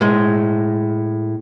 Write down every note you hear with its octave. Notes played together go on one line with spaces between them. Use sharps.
A2 G#3